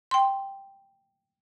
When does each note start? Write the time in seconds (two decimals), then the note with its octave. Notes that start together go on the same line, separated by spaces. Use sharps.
0.11 G5 C6